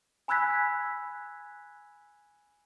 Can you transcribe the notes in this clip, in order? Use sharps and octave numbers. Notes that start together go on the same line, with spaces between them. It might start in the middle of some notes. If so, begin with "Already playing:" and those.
G#5 B5 E6 F#6 G#6 B6